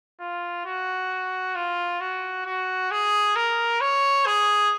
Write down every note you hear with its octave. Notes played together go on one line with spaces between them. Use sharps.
F4
F#4
F4
F#4
F#4
G#4
A#4
C#5
G#4